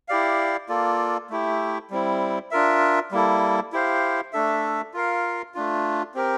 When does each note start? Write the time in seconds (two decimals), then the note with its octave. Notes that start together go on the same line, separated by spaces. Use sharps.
0.08 E4 G4 D5 F5
0.69 A#3 F4 A4 D5
1.30 A3 E4 G4
1.90 G3 C4 E4
2.51 D4 F4 A#4 E5
3.11 G3 A#3 E4 A4
3.72 E4 G4 C5 F5
4.33 A3 D4 A4 E5
4.94 F4 A#4 F5
5.55 A3 D4 F4
6.14 C4 G4 A#4